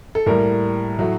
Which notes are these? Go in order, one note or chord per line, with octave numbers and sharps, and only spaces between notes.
A4
A2 G3 A#3 A#4
A2 F#3 A3